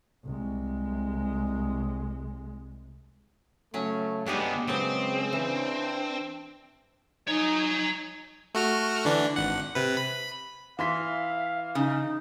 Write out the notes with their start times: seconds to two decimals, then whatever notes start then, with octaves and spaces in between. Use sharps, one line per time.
0.25 C2 G#3
3.74 C#3 F#3 A3 C#4
4.26 G2 G#3 B3 D4 G4 G#4
4.68 C#3 F#3 G#3 B3 C4 C5
5.33 E3 D4
7.28 D#4 C#5 G#5 A#5
8.55 A3 F#4 F6
9.05 D3 E3 D4
9.36 G#1 F#5
9.75 C3 B4
9.97 B5
10.79 E3 E5 F5 C6 B6
11.75 C#3 D#4